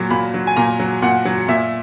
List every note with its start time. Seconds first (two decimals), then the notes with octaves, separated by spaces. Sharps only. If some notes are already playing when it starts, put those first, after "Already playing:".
Already playing: A#2 F#3
0.11 A#2 B5
0.34 F#3
0.47 G#5
0.56 A#2 A#5
0.80 F#3
1.02 A#2 F#5
1.25 F#3
1.48 A#2 E5